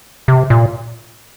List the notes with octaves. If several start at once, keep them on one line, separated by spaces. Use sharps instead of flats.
C3
A#2